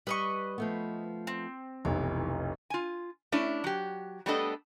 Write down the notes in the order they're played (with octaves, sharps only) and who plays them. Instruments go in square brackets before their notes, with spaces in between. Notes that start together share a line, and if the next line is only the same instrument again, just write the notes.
[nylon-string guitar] G3 [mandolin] B4 D#5 C#6
[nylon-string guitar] F3 A3 B3
[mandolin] C4
[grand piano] F1 B1 [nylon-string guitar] E3
[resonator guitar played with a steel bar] F4 G#5
A3 C#4 D4 E4
F#3 G4
G3 A3 B3 D4 A4 D#5